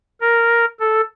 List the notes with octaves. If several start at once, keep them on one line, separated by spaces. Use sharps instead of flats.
A#4
A4